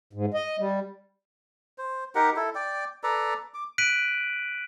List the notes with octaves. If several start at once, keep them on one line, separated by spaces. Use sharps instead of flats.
G#2
D#5
G3
C5
D#4 G4 A#4 F#5
E4 A4
D5 G5
A4 B4 D5 A#5
D6
F#6 B6 D7 D#7 F#7